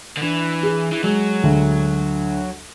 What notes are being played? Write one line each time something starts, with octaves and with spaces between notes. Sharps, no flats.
D3
E3 D4
G#4
E3
F#3 G#3
D2